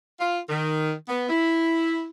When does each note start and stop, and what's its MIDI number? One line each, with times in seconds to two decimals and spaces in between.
0.20 0.40 65
0.49 0.93 51
1.09 1.25 59
1.29 2.09 64